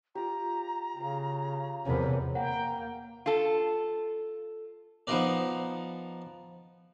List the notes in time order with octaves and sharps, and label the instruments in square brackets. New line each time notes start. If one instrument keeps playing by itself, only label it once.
[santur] F4 G4 [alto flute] A#5
[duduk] C#3 [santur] G4 F5
[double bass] E2 C3 [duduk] F3 [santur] C#4 A#4 B5
[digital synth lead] A#3 [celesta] F#5 [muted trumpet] G5 [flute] A#5
[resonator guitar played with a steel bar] F4 A4
[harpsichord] F3 B3 D#4 F4 A#4 D5